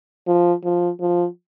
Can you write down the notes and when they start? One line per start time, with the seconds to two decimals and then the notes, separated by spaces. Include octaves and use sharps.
0.27 F3
0.64 F3
1.00 F3